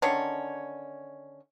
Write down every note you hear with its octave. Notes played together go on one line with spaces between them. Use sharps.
D3 D#3 C#4 C#5